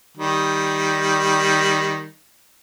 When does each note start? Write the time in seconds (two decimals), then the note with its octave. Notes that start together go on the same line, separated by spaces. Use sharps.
0.17 D#3 G3